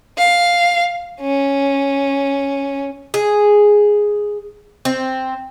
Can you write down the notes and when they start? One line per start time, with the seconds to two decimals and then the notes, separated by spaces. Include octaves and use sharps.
0.18 F5
1.20 C#4
3.14 G#4
4.85 C4